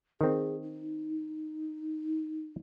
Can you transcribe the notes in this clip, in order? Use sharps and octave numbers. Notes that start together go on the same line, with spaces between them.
D#3 C4 G#4
D#4